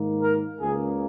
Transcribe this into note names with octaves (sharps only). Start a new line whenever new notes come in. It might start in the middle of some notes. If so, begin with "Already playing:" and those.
Already playing: G#2 D#3 A#3
A#4
C#2 C#3 A#3 G#4